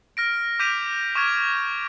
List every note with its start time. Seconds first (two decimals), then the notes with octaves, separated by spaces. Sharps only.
0.17 F6 A#6 D7
0.59 D6 G6 B6 D7 D#7 F7
1.15 C#6 D6 F6 G#6 D7